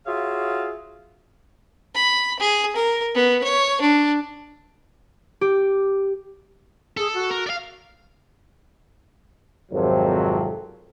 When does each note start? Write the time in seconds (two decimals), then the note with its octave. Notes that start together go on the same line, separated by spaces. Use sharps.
0.06 F4 F#4 G#4 C#5 E5 F5
1.94 B5
2.39 G#4
2.76 A#4
3.15 B3
3.43 C#5
3.81 D4
5.41 G4
6.97 G#4 A4
7.13 F#4
7.31 A#4
7.47 D5 F5
9.72 G#1 F2 C3 F#3